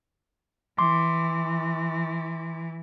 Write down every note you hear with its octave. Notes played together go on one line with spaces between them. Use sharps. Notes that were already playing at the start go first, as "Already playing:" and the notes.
E3 C6 D6